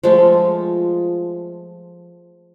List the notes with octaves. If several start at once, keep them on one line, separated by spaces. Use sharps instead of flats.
F3 G#3 A3 F4